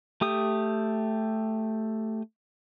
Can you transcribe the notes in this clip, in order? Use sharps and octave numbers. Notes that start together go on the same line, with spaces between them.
A3 G4 D#6